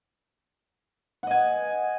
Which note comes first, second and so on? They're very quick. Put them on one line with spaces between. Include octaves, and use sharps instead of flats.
F#5 D#5 G#5